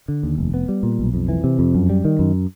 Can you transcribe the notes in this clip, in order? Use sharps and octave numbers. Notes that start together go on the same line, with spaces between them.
D3
D#2
F1
B3
G3
A#2
B1
F2
E3
C3
F2
F#2
G3
D#3
F#2